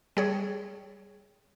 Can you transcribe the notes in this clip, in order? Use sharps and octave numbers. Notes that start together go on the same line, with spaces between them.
G3 G#4 C#5